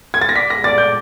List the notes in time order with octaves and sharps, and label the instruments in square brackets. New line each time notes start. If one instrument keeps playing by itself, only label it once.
[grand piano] G#6
A6
A#6
[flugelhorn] D5 [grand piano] B6
[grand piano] A#6
[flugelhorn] D5 [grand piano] A6
[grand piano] G6